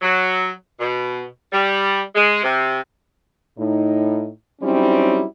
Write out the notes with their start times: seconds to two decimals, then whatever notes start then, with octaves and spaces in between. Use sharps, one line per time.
0.01 F#3
0.80 B2
1.53 G3
2.15 G#3
2.43 C3
3.58 A2 D#4
4.61 F#3 G3 C4 C#4 D#4 E4